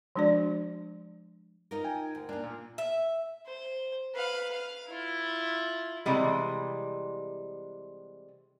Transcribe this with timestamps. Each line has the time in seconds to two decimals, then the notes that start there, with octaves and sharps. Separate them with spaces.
0.16 F3 G#3 D4 F#4 D5
1.71 D#4 F4 A#4
1.84 G5 G#5
2.15 D2
2.29 A#3 D4 F4
2.43 A#2
2.78 E5
3.46 C5
4.15 B4 F5
4.53 F5
4.89 E4 F4
6.06 C3 E3 G3 G#3